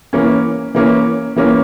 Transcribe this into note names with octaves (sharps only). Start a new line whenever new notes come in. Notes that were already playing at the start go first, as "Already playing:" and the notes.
E3 A#3 C#4
E3 A#3 C#4
E3 A#3 C#4